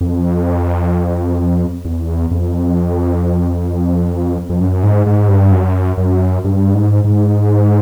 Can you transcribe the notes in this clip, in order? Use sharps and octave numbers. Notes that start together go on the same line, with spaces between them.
F2
E2
F2
F2
F#2
G#2
G#2
G2
F#2
F#2
G2
G#2
G#2